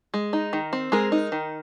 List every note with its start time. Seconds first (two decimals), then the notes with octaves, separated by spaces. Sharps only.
0.14 G#3
0.33 D#4
0.53 D#3
0.73 C4
0.92 G#3 G#4 A#4
1.12 D#4
1.32 D#3